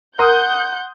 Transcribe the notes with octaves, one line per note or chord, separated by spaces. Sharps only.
A#4 F#5 C6 D#6 G6